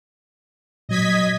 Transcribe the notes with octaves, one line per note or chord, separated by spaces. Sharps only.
A#2 F#3 D#5 G#6 B6